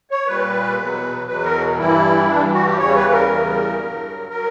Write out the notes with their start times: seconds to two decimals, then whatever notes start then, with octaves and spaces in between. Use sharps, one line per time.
0.11 C#5
0.27 A#2 G3 B4
0.78 E2 B2 F#3
1.27 E2 B2 F#3 B4
1.44 A#4
1.78 G2 E3 G3 E4
2.29 G2 E3 G3 D4
2.53 F#4
2.65 G4
2.78 E2 C#3 E3 G3 C#5
2.95 B4
3.12 A#4
3.29 E2 C#3 E3 G3
3.78 G2 F#3
4.29 F#3 A#4